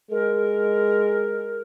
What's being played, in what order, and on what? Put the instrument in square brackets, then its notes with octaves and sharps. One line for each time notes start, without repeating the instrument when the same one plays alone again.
[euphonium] G#3 [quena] A#4